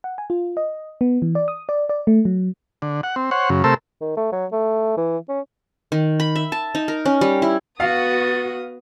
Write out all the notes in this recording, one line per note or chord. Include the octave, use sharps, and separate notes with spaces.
F#5
G#5
F4
D#5
B3
E3
D5
D#6
D5
D5
A3
F#3
D3
F#5
C4
C5 C#5 F#5
F#2 C#3
C3 A3 A4 A#4 C5 E6
D#3
A3
F#3
A3
E3
C#4
D#3
B5
E5
A5
D#4
A#4
C#4
G3
E4
B3 F#4 F5 D#6 A6